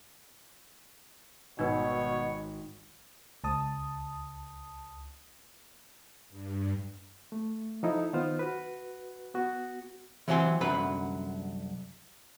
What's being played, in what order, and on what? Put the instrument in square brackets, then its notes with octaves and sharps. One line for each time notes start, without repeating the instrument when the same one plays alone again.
[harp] G#1 [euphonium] B2 [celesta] D#4 B4 [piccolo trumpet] C#5
[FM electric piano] C#2 A5 D#6
[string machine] G2
[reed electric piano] A3
F3 D#4 E4 A4
D#3 B3 D#4 F4 C5 F6
F#4 B4
B3 F#4
[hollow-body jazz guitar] E3 F#3 C4 G4 G#5 C6
C2 F#2 D3 F#3 B4 B5